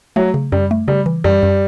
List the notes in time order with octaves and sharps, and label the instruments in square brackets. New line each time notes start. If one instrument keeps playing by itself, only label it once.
[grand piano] F#3 [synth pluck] A3
[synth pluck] C#3
[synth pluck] F#2 [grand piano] G3
[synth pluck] A3
[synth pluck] C#3 [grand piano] G3
[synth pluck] E3
[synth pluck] F#2 [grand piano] G3
[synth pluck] F#2